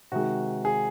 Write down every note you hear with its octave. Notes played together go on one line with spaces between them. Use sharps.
C3 D#3 G#3 F#4
G#4